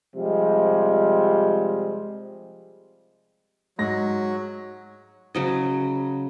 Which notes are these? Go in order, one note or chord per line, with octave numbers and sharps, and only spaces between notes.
C3 F3 G3 G#3
G#2 F#3 A#6
C#3 F#3 D#5